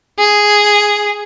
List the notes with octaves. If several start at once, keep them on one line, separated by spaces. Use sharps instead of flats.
G#4